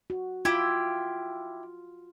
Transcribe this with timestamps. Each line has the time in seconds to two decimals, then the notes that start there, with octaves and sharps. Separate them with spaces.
0.10 F#4
0.45 E4 F4 G4